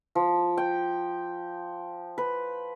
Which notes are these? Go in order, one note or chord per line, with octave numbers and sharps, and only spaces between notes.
F3
G5
B4